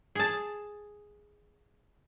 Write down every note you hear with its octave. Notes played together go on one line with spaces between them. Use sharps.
G#4 A5